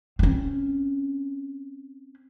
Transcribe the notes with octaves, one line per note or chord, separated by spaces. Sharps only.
C4 C#4